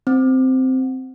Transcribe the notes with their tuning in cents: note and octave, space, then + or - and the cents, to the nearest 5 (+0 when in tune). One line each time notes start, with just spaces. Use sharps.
C4 -10